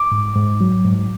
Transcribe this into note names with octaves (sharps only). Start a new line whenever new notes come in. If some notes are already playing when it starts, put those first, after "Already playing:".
Already playing: D6
G#2
G#2
F#3
G#2